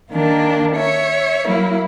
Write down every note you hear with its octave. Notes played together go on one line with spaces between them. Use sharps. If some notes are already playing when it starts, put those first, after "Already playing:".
D#3 A#3 D4
C#5 E5
F#3 A#3 E4